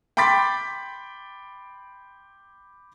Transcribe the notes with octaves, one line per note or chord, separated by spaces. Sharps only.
G5 B5 C6 D6 A6 B6